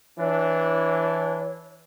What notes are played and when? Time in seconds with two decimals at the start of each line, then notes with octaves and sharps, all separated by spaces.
0.18 E3 D4 C#5